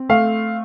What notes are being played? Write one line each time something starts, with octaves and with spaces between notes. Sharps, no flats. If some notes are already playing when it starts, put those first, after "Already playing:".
Already playing: C4
A3 F5